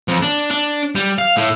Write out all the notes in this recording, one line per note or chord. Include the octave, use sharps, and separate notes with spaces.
F2
D4
D4
G3
F5
A2